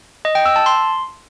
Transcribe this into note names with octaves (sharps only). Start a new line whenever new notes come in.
D#5
G5
E6
A5
C6